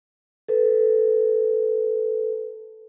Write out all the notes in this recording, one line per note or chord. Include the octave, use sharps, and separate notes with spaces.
A4 B4